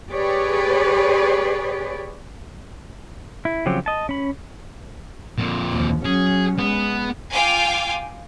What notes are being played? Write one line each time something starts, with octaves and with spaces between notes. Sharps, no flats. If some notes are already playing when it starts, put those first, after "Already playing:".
G4 G#4 B4 C#5 D5
E4
C#3 F3 F#3 C4 G4
D#5 A5
C#4 B5
F2 A#2
D#2 F3
F#3 C#4 G#4
G#3 B3
F4 F5 G5 G#5 D6